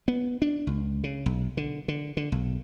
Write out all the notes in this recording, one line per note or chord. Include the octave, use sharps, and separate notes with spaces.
B3
D4
C#2
C#3
B1
D3
D3
D3
B1